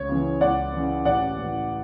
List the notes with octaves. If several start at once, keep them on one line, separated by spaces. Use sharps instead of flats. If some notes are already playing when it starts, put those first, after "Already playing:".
Already playing: C#2 C#5
C#3 E3
C#2 D5 F#5
C#3 E3
A1 D5 F#5
A2 E3